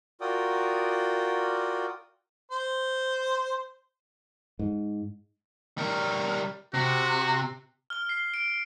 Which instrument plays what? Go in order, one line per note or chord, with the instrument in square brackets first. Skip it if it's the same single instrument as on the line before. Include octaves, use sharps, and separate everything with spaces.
[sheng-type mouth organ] F4 F#4 A#4 D5 G5 D#6
[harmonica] C5
[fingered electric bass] G#2
[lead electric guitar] G3 A#4
[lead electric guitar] C3 [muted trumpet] F#4
[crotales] F6 G7
C7
D7